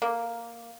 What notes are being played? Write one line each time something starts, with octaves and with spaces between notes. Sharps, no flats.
A#3